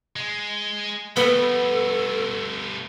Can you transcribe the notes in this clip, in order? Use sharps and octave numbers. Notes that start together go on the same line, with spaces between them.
G#3
G3 A3 B3 A4